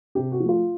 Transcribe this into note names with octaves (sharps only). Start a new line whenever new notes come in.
C3 G4
F#4
F3
A3 F4